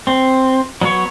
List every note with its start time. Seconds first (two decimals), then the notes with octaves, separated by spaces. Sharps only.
0.07 C4
0.81 F#3 B3 C#5